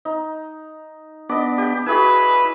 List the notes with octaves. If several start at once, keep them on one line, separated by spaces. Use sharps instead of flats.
D#4
B3 D4 D5 D#5
G4 G5
E4 F#4 G#4 B4 G#5